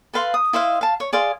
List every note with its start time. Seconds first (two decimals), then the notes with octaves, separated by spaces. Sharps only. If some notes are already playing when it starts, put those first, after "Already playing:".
0.14 A4 B4 F5 C6
0.34 D#6
0.53 E4 C5 D#5 F5
0.81 F5 A5
1.00 C#5
1.13 G#4 D5 F5 C6